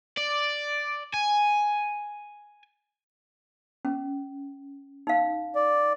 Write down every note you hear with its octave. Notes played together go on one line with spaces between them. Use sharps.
D5
G#5
C#4
D#4 F5
D5